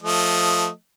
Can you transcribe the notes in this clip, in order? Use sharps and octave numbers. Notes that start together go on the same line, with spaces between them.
F3 A3 D#5